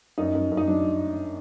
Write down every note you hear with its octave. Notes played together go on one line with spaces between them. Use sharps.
F#2 D#4
F#2
F#2
D#4
F#3 D4